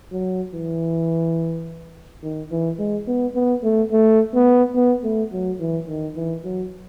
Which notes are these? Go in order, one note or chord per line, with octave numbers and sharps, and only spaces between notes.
F#3
E3
D#3
E3
G#3
B3
B3
A3
A3
B3
B3
A3
F#3
E3
D#3
E3
F#3